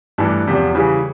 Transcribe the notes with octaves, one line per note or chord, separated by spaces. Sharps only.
G2 E3 A3 D4
E2 C3 F3
C#3 E3 G3